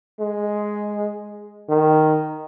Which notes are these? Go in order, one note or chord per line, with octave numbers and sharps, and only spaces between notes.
G#3
D#3